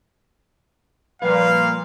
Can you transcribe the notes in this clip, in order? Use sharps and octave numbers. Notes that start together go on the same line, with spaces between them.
A#2 F3 G3 B4 F5